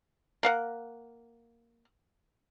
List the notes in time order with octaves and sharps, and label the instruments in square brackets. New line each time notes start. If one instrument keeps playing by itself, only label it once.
[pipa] A#3 F5 F#5